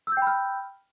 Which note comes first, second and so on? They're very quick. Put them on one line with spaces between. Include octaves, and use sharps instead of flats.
E6 G6 G5 B5 F6